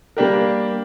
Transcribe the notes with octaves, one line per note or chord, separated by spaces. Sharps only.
G3 A#3 D4 G4 A#4